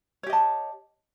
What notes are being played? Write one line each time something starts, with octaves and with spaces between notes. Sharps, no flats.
G4 C#5 D#5 A5